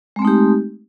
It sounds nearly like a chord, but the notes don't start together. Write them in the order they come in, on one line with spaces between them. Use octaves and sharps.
G#3 C4 A3 D#4 G4